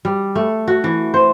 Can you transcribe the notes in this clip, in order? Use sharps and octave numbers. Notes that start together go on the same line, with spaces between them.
G3
A3
F#4
E3
C5